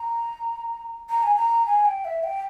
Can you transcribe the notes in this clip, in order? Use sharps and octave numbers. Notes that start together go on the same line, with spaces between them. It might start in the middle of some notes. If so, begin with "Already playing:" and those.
Already playing: A#5
A#5
G#5
A#5
G#5
G5
E5
G5